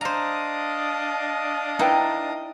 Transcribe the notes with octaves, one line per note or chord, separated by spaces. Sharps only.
D4 C5 D#5 F5 A#5 D#6
D#4 E4 B4 G5